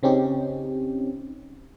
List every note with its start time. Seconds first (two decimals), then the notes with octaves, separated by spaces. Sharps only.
0.03 C#3 C4 C#4 D#4 G4